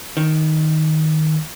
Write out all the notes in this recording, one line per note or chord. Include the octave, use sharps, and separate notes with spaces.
D#3